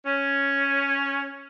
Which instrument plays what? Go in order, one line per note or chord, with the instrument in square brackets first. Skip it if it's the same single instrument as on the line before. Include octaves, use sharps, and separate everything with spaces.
[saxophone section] C#4